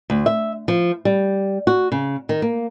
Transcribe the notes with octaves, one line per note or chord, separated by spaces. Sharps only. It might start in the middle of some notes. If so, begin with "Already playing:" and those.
D2
E5
F3
G3
F#4
C#3
D#3
A#3